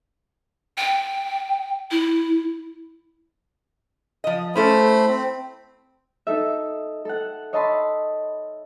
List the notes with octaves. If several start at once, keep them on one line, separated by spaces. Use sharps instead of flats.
G5
E4
F3 D#5
A3 C#4 E4 A4 C5 B5
C4
D#4 A4 E5
A4 F#5
C#5 D#5 E5 A5 B5 C6